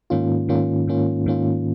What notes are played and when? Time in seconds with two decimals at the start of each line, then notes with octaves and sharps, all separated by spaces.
0.10 G#2 D#3 A#3 C#4 F4
0.49 G#2 D#3 A#3 C#4 F4
0.87 G#2 D#3 A#3 C#4 F4
1.26 G#2 D#3 A#3 C#4 F4